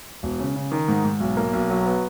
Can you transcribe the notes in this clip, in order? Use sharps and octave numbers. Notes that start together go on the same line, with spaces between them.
E1
C#3
C#3
D#3
G#2
G#2
B1
A#3
B1
F#3
B3